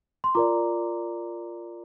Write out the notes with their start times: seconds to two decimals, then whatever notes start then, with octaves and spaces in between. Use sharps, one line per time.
0.24 C6
0.35 F4 A#4 D5 A#5 D6